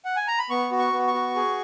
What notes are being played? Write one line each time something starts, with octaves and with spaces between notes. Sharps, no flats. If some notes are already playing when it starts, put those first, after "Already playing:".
F#5
G#5
A#5
B5
B3 C#6
F#4
C#6
B3
C#6
F#4
G#4